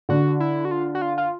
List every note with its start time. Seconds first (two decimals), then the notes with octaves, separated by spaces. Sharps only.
0.09 D3 F#4
0.40 E4
0.65 F#4
0.71 F4
0.95 F#4
1.02 F4
1.18 F4